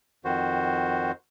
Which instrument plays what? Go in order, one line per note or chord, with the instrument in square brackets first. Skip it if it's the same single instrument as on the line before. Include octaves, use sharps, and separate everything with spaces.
[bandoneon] F2 D#3 F#4 C5